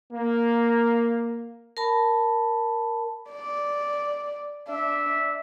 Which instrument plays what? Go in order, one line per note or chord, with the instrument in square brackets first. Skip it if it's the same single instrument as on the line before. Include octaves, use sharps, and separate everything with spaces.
[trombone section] A#3
[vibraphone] A#4 A5 B5
[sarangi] D5
[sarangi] D4 [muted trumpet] E5